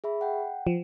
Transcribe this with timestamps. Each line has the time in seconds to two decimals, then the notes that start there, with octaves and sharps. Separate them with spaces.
0.04 G#4 E5 B5
0.21 F#5 G5
0.67 F3